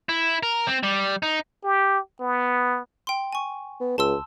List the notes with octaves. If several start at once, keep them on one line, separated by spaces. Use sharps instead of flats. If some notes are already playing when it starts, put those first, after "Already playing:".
E4
A#4
C4
G3
D#4
G4
B3
G5 C6
G#5 C#6
B3
C#2 A5 C6 E6